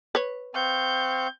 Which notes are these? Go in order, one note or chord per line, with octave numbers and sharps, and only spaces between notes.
B4 C#5
C4 F5 C#6 G6